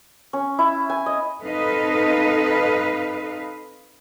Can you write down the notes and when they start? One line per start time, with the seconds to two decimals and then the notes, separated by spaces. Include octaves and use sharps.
0.33 C#4
0.59 E4
0.90 G#5
1.06 D#5
1.41 C4 D#4 A4 B4 D#5 F5